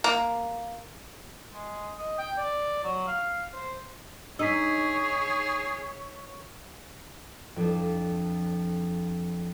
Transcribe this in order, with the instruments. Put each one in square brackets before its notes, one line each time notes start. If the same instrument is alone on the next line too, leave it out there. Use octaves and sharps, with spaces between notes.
[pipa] A#3
[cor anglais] G#3
D#5
G5
D5
F#3
F5
C5
[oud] D#4 [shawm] G#4 [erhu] C#5 [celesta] E6 B6
[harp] F2 D4